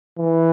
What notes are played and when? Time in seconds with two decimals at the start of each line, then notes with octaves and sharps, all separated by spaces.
0.18 E3